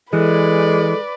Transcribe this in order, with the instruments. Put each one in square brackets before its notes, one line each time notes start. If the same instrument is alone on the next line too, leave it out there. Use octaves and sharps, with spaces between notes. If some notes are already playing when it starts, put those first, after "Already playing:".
[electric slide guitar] E3 [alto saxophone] G#3 [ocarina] A4 [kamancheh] B4 D5